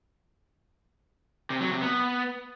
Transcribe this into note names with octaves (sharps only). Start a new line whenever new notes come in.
C3
F#3
C3
B3